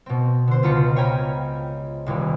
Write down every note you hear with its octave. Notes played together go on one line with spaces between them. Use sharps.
B2 C4
D3 C5
C#2 B2 F4 A#5 B5 C#7
C#5 G5 G#5 A#5 B5
D#1 C2